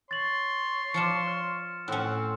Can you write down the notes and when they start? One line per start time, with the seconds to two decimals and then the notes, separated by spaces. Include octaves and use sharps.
0.11 C#5 C6 A6 F#7
0.94 F3 F4 D5 C#7 E7
1.27 F6
1.88 A2 C4 C#4 F#5